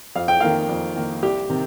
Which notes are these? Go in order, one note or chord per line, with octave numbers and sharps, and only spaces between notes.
F2 F5
G5
D#3 A#3 F5
F2
D#3 A#3
C2 G4
C3 D#3